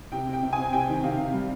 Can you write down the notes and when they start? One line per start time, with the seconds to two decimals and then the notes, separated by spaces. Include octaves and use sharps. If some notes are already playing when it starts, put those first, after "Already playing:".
0.12 C3 G5
0.28 C3
0.33 G5
0.43 C3
0.53 G#5
0.58 C4
0.73 C3 G5
0.89 D#3
1.03 C3 F5
1.18 C3
1.34 G3